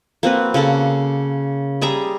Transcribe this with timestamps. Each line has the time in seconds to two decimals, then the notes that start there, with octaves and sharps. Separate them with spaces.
0.23 A#3 C4 F#4 B4
0.54 C#3 A#3 C#4 A4
1.81 G3 G#4 E5 A#5